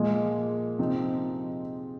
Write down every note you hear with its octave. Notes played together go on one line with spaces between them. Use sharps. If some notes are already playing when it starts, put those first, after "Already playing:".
Already playing: A#2 F3 G#3 A#3 F4
C3 F3 C4 D#4